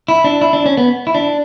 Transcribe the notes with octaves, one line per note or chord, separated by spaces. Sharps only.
E4
D4
E4
D4
C#4
B3
E4
D4